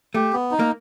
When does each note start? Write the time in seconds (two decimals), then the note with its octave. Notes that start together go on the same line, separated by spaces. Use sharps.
0.15 A3 G4
0.33 B3
0.51 D#4
0.59 A#3